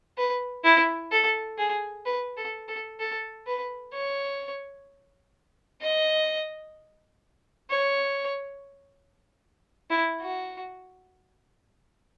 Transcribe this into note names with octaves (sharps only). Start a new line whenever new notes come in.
B4
E4
A4
G#4
B4
A4
A4
A4
B4
C#5
D#5
C#5
E4
F#4